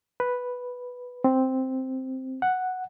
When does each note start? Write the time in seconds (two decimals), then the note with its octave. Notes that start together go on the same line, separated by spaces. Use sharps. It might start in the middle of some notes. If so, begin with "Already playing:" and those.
0.20 B4
1.24 C4
2.42 F#5